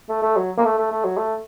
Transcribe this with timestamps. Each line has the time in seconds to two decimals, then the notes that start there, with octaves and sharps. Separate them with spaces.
0.09 A3
0.22 A3
0.37 F#3
0.58 A#3
0.65 A3
0.79 A3
0.92 A3
1.05 F#3
1.17 A3